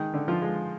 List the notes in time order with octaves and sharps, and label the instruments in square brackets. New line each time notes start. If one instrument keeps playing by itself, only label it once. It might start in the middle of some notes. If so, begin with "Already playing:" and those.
Already playing: [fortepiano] D#3 G#3 D#4
D3
F3 F4
G#3